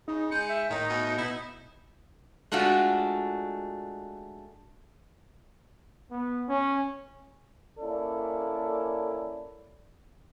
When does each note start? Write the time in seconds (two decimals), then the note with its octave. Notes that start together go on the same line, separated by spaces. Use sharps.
0.08 C#3 D#4
0.31 G#3 G6 C#7
0.48 E5
0.70 A2 D#3 D#4
0.89 B2
1.18 B2 E4
2.52 G#3 A3 D4 F4 F#4
6.11 B3
6.48 C#4
7.80 A#3 C#4 E4 A4 D5